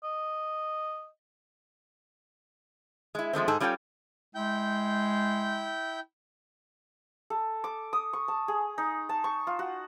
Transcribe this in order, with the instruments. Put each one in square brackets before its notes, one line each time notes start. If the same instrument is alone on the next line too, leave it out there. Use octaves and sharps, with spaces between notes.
[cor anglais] D#5
[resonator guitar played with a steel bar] G#3 E4
F3 G#3 A3 C4
G#2 G#4 A4
G3 C#4 F4 A4 G5
[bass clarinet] G#3 [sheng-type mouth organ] E4 G5 G6
[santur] A4
D6
D#6
C#6
A5
G#4
D#4
A5
C#6
F4
F#4